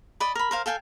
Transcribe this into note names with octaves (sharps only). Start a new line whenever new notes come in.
D5 D#5 B5
A#4 B5
A#4 C5 F5
A4 F5 G5 G#5